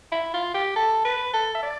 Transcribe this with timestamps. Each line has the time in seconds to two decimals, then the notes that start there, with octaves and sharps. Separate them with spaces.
0.12 E4
0.34 F4
0.54 G4
0.76 A4
1.05 B4
1.33 A4
1.55 E5
1.62 D5